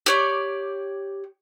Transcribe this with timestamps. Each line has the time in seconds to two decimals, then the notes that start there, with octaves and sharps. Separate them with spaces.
0.06 G4 C#5 D5